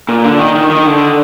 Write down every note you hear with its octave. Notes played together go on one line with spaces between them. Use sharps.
A#2
D3
D#3
D#3
D#3
D3